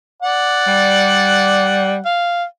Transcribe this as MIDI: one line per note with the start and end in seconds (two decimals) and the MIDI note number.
0.23 2.05 74
0.23 2.05 78
0.68 1.98 55
2.05 2.44 77